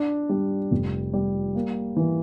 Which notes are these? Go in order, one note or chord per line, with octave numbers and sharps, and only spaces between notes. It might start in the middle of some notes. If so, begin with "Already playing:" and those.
Already playing: D4
G3
F1
G3
A#3
E3